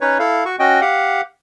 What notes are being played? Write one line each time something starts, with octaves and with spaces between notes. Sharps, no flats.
C#4 D#4 B4 C#5
E4 A4 F5
F#4 C#6
C#4 F#4 D#5 G5
G4 F5 F#5